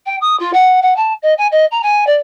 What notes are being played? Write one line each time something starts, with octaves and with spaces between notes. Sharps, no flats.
G5
D#6
F4
F#5
F#5
A5
D#5
G#5
D#5
A#5
G#5
D5